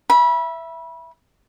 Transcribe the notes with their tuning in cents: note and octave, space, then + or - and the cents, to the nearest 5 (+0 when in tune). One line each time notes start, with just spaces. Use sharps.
E5 +5 B5 -25